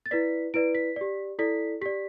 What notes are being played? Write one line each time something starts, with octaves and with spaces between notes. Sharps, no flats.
A6
E4 B4 D5 B6
E4 B4 D5 D7
B6
G4 D5
E4 A4 D5 B6
G4 D5 B6